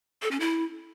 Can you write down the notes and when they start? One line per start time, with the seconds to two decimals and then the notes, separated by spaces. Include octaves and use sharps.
0.22 A4
0.31 C#4
0.40 E4